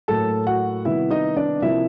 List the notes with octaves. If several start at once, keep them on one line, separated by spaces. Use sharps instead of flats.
A2 F#3 A#3 A4 A5
F#4 F#5
C3 D#3 G3 B3 E4 E5
D#4 D#5
D4 D5
C3 F3 A#3 E4 E5